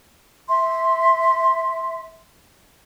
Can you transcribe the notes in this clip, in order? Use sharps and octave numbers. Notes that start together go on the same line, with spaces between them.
E5 C6